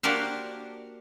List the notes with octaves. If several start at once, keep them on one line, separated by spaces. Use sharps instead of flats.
A#3 D4 F#4 G4 A#4 C5